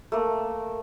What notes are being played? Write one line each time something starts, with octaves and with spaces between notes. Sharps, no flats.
A3 A#3